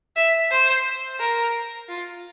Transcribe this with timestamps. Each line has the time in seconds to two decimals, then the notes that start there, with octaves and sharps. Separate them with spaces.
0.16 E5
0.51 C5
1.20 A#4
1.89 F4